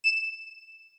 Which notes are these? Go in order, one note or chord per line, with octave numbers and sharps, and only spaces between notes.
E7